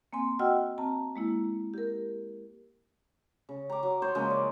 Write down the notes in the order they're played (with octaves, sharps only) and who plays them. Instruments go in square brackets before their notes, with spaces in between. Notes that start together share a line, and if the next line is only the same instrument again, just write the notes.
[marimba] A#3 C4 G#5 C6
F#4 D#5 F#5 G5 E6 F6
C4 A5 A#5
G#3 A#3 E4
G4 A#4
[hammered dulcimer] C#3
A#5 D6
F#3
C5 C#5
C#3 F3 G#3 A#3
D5